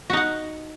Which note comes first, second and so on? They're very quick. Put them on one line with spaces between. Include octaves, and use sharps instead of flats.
F#4 D#4 F#5